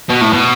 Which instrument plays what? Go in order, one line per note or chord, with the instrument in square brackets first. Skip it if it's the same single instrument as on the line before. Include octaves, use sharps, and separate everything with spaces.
[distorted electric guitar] B2
A2
B2